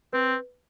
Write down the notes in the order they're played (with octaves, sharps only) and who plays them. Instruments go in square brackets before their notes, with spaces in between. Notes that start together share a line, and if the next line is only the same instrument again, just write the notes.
[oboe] C4 [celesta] B4